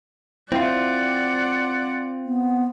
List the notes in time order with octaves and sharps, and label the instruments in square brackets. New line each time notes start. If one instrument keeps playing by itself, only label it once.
[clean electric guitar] C4 F4 [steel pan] E4 G5 [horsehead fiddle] D5 F#5
[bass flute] B3